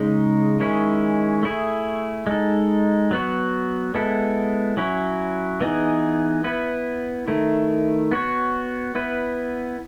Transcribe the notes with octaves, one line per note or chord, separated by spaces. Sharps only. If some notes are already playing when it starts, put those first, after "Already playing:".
Already playing: C#3 G#3 D#4
D#3 G#3 C#4 E4
A3 E4 G#4
G#3 D#4 A4
F#3 B3 F#4
G#3 B3 E4 A4
F#3 C#4 E4
E3 B3 D#4 G#4
B3 E4 B4
D#3 A3 E4
B3 F#4 C#5
B3 E4 B4